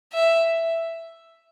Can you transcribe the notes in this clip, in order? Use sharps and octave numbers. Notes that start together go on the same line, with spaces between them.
E5